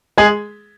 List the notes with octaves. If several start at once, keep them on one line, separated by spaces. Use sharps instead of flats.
G#3 G#4